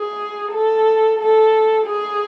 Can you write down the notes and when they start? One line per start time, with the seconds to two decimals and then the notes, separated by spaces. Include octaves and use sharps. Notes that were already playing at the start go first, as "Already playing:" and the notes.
Already playing: G#4
0.52 A4
1.19 A4
1.86 G#4